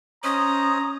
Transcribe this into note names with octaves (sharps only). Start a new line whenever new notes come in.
C#4 C5 C#5 D#5 A#5 D#6